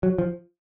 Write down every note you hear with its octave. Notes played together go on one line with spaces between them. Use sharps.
F#3
F3